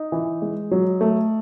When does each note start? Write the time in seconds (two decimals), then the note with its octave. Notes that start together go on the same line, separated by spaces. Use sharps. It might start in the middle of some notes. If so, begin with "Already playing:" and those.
Already playing: D#4
0.12 E3
0.42 G#3
0.71 F#3
1.01 A3